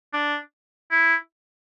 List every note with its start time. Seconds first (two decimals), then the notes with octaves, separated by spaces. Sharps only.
0.13 D4
0.91 E4